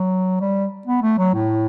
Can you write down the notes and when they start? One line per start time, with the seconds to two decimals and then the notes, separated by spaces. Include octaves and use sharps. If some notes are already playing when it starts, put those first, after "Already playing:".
Already playing: F#3
0.41 G3
0.87 B3
1.02 A3
1.18 F#3
1.34 A2